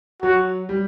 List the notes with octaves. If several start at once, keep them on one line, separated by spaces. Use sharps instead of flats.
F#3 F#4
G3